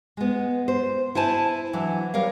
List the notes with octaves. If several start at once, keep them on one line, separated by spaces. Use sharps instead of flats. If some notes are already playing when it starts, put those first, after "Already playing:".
G#3 B3
C5
E4 C5 G#5 A5
E3 F#3 D4
G3 A#4 C#5 F5